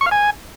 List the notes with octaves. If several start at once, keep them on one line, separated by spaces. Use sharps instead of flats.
C#6
F5
G#5